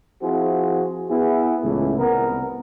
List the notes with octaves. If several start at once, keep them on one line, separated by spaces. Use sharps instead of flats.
F3 C4 E4 F#4 G#4 C5
B3 E4 G#4
C#2 A2 E3
C2 B3 A#4